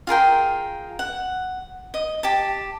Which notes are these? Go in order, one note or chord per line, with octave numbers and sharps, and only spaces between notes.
F4 G#4 A#4 G5
F#5
D#5
G4 A5